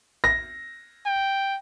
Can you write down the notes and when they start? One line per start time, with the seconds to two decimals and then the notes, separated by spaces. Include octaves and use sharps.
0.24 A#6
1.06 G5